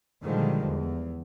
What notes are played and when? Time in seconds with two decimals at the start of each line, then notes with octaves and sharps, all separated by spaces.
0.24 A#2 D3 D#3 F3 G3 G#3
0.65 E2